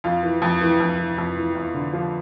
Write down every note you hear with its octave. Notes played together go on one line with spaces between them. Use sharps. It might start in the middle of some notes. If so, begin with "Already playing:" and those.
F2 F4
E3
F2
E3
F2
E3
F2
E3
E2
D3
F3